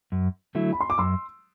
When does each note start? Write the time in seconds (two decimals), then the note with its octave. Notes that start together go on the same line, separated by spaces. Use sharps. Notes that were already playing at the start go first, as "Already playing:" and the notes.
0.12 F#2
0.55 D3 F#3 A3 E4
0.73 B5
0.81 C6
0.90 D6
0.98 F#2 C6 E6